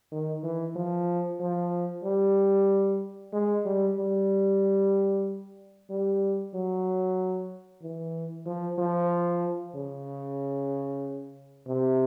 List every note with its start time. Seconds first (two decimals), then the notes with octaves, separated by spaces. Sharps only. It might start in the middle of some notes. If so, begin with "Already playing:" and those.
0.12 D#3
0.43 E3
0.76 F3
1.40 F3
2.04 G3
3.33 G#3
3.65 G3
3.97 G3
5.90 G3
6.54 F#3
7.82 E3
8.46 F3
8.78 F3
9.75 C#3
11.67 C3